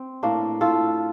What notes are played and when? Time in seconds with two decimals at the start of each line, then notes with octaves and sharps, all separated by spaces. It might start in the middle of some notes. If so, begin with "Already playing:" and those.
Already playing: C4
0.23 A2 A#3 D4
0.61 A2 F4 A4